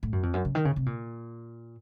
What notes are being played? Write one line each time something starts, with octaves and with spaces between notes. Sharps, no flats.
A2
F#2
F2
F#2
C#3
D#3
C#3
C3
A#2